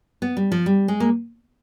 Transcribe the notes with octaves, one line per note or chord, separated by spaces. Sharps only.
B3
G3
F3
G3
G#3
A#3